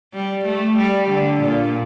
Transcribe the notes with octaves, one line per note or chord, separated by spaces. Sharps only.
G3
A3
G3
D3
A#2